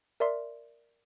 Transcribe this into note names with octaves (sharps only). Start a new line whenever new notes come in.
A#4 D5 E5 C6